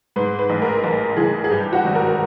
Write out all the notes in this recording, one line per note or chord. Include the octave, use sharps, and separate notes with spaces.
G#2 B4
B4
A1
A#4
A1
E3 G#4
G#4
G2 G4
F#4
G#1
A#4